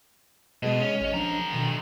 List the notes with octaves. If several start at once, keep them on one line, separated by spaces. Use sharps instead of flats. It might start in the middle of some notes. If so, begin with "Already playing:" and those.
B2 G#3 G#4 D#5
C#4
G#1 D#5
D3 F3 D4 A#5
B2 D#3